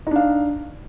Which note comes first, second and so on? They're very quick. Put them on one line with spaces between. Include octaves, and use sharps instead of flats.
D#4 D4 F5